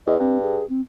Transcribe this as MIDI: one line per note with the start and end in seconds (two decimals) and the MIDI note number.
0.07 0.16 40
0.07 0.15 75
0.19 0.60 43
0.19 0.37 60
0.42 0.65 68
0.70 0.81 60